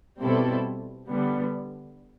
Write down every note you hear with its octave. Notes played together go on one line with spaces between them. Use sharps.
B2 G3 C4 E4 A4
D3 G3 B3